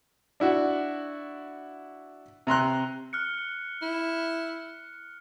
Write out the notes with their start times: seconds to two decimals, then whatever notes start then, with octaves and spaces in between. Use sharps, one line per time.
0.40 D4 E4 F#4
2.47 C3 A#5 C6 F#6
3.13 F6 F#6 C#7
3.82 E4